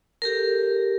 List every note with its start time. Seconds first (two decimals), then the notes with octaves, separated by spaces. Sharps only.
0.22 G4 A4 A#4